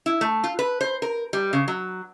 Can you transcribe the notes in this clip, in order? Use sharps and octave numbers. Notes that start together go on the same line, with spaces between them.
E4
A3
F4
B4
C5
A#4
G3
C#3
F#3